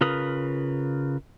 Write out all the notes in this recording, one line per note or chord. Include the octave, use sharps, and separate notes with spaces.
C#3 F4 A#4 B4 D#6